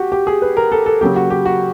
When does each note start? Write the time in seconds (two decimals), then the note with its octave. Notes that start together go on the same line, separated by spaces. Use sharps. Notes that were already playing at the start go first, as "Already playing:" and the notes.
Already playing: F#4 G4
0.12 G4
0.27 G#4
0.42 B4
0.57 A#4
0.72 A4
0.86 A4
1.01 C#3 F#3 A#3 G4
1.16 F#4
1.30 G4
1.46 F#4